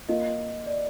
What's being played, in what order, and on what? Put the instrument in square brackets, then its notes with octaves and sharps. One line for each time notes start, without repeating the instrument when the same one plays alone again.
[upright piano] A#3 F4 A#4 [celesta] D#5
[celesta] D5